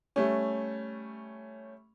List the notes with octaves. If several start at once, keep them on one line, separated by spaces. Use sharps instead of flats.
G3 A3 C#4